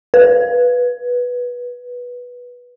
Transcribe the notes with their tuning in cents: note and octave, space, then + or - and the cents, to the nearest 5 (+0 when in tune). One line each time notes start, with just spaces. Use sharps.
B4 -10